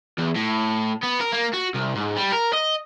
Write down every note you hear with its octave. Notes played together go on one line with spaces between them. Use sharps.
E2
A2
B3
A#4
A#3
F#4
C2
G#2
G3
A#4
D#5